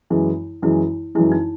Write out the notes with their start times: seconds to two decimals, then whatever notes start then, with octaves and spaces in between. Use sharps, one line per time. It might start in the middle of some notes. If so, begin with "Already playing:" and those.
0.10 F#2 E3 G#3 E4
0.62 F#2 E3 G#3 E4
1.15 F#2 E3 G#3 E4
1.32 D#4